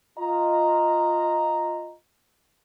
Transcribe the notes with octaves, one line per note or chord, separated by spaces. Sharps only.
F4 D#5 A#5